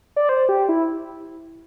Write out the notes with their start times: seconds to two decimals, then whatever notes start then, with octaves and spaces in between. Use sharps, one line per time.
0.16 D5
0.29 C5
0.49 G4
0.69 E4